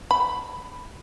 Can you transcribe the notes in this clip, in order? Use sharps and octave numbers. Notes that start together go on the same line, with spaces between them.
B5